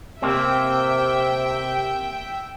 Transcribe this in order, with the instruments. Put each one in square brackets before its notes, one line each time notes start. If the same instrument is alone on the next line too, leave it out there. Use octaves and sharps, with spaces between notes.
[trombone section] C3 [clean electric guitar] A#3 C4 [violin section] E5 G5